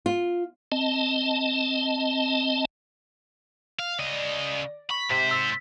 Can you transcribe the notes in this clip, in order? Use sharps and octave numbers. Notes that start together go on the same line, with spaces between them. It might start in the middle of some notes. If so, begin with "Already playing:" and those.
F4
C4 D#5 A5
F5
C#3 D5 D#5
B5 C#6 B6
G#2 C3 C5 B6
E6 A6